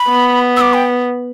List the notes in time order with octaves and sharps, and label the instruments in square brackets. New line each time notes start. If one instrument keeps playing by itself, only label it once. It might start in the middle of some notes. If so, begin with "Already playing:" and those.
Already playing: [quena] B5
[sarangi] B3
[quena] E6
D6
G5